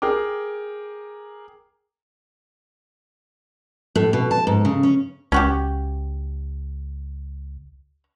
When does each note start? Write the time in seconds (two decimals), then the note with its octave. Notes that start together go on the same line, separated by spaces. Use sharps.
0.02 G#4 A#4 G5 D6
3.95 A2
4.13 B2
4.31 A5
4.47 G#2
4.65 C#3
4.83 C#4
5.32 C#2 C#4 F#4 G4